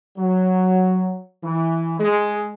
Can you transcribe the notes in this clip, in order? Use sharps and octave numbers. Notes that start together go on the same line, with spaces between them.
F#3
E3
G#3